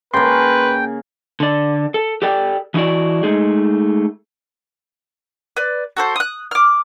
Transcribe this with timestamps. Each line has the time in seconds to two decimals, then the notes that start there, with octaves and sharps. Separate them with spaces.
0.14 C#3 A#3 B4 G5 C6
1.40 D3 D5
1.94 A4
2.22 G4 A4 D5 G5
2.74 E3 D#4 E4 F#4 D5
3.23 G#3 A3 D#4 G#4
5.56 B4 D5
5.97 F#4 A4 C5
6.16 D#6 F#6
6.51 D6 F6